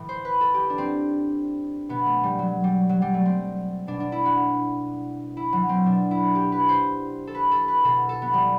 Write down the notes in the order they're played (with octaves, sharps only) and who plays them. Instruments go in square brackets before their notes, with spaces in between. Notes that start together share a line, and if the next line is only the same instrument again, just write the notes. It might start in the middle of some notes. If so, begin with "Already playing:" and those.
Already playing: [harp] A2 E3
C5
B4
A4
G4
D4
C4
B2 B3
A3
G3
F#3
G3
F#3
G3
A3
C4
B2 D4
D4
E4
F#4
E4
F#3
C4
B2 D4
E4
G4
B4
C5
A4
B4
A4
B4
B2 A4
A4
B3
G3